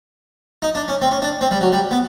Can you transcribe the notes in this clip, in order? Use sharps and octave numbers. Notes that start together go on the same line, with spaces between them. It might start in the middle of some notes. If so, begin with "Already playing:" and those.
D#4
D4
C#4
C4
C#4
D4
C4
G3
F#3
G3
B3